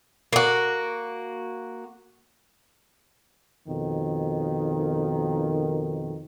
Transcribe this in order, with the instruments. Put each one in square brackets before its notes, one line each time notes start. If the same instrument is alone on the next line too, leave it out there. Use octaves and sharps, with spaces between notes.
[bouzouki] A#3 F#4
[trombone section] F2 B2 D#3